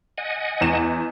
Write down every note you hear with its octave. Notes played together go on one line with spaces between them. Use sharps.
D#5 F#5 G#5
E2 E7